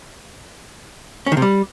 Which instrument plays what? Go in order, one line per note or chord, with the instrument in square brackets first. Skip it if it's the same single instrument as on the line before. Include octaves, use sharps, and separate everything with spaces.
[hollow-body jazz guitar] C#4
D#3
C3
G3